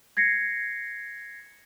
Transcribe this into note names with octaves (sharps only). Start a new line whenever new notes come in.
G#6 A#6 C7 C#7